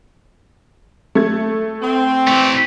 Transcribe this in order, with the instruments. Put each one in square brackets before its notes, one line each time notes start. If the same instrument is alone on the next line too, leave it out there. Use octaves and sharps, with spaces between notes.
[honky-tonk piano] A3 G#6
[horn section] C4
[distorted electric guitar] E3 A3